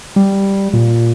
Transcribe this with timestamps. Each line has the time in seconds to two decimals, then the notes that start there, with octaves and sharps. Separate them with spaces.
0.16 G3
0.73 A#2